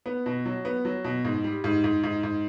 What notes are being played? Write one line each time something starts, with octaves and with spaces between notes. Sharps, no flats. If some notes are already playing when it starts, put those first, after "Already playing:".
B3
B2
F#3
B3
F#3
B2
G#2
G3
G#2
G#2
G#2
G#2